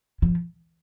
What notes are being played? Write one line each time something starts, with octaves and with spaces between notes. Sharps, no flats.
F3